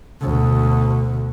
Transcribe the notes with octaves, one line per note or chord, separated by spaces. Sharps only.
D2 B2